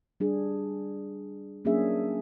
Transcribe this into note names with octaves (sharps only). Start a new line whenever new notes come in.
G3 D4 G#4
F#3 A#3 C#4 D4 G#4 E5